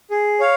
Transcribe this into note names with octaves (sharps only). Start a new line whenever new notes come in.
G#4
C#5 F5